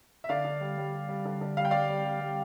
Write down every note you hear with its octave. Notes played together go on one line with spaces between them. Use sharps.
E5
D3 D5 F5
D3
G3
G3
G3
G3
D3
D3
G3 F5
G5
G3 D5 F5
G3
G3
G3